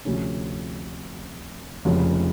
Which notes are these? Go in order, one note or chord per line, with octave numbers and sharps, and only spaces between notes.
D2 C3 F3 A3 C#4
F1 F2 C#3 F3 G#3